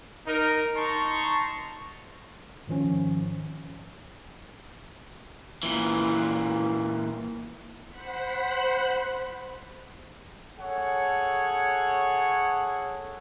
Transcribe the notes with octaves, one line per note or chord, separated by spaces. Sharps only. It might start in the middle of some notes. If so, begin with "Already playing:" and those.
D#4 A#4
D#4 A5 A#5 C6 C#6
G#2 D#3 F3 C#4
A#2 E3
C5 F#5 B5
G#4 A4 C#5 F#5